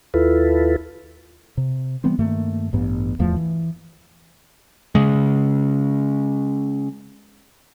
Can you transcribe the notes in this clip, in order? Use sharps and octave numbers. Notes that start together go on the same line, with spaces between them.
D#2 E4 F4 A4 B4
C3
E3 G3 B3 C4
G2 D#3 A3 A#3
A1 G2 B3
D1 E2 F3 A3
E3
C#3 G#3